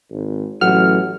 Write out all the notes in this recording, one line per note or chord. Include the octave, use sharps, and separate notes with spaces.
G#1
A1 F#3 F#5 F6